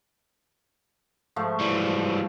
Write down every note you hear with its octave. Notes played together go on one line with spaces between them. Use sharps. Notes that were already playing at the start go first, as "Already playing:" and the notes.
G#2 F3 A3
E3 G3